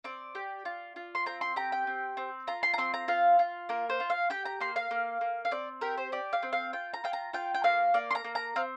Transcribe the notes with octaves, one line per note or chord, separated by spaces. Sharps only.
C4 D5
G4
F4
F4
C6
C4 A#5
C6
G4 A#5
G5
C4
C4
F4 A#5
C6
A#5
C4 C6
A#5
F4 F5
F4
A#3 A#4
C5
F4
F5
G4 G5
A#5
A#3 C6
F5
A#3
A#3
F5
C4 D5
G4 A#4
C5
G4 D5
F5
C4
F5
F4 G5
A#5
F4 G5
A#5
F4 G5
G5
A#3 F5
A#3 D5
C6
A#5
A#3
A#5
C4 F5